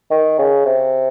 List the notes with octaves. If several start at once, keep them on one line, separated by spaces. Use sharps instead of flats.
D#3
C#3
C3